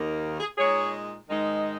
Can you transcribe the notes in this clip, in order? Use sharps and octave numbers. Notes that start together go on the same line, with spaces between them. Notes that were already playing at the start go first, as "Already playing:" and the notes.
Already playing: D#2 D#3 A#3
G#4
A#2 G#3 D#4 G#4 C#5
G#2 D#3 G#3 D#4